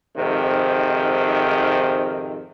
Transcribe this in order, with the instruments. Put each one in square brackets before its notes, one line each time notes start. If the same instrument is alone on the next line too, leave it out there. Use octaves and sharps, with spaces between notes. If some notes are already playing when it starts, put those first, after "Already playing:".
[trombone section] F2 G#2 C3 D#3